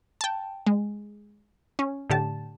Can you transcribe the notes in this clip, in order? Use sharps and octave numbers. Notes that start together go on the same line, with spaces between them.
G5 A5
G#3
C#4
A2 D3 G4 A5